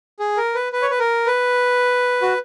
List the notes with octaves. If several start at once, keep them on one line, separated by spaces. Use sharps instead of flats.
G#4
A#4
B4
B4
C#5
B4
A#4
B4
F#4